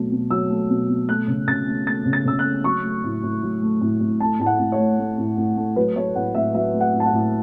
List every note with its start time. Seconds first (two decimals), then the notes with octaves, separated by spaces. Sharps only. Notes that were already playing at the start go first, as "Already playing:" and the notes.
Already playing: B2 F#3 A3
0.11 B2
0.31 F#3 E6
0.50 A3
0.70 B2
0.89 B2
1.09 A3 F#6
1.28 C#3
1.48 C#3 A6
1.67 A3
1.87 A3 A6
2.06 C#3
2.13 A6
2.25 C#3 E6
2.39 F#6
2.45 A3
2.64 F#3 C#6
2.84 A3
3.04 A2
3.23 A2
3.43 F#3
3.62 A3
3.81 A2
4.01 A2
4.20 A3 A5
4.40 A2 A5
4.46 F#5
4.59 A2
4.72 C#5
4.79 A3
4.99 A3
5.18 A2
5.38 A2
5.57 A3
5.76 F#3 B4
5.96 A3 C#5
6.15 A2 F#5
6.35 A2 E5
6.54 F#3 E5
6.74 A3
6.81 F#5
6.93 A2
7.00 A5
7.06 F#5
7.13 A2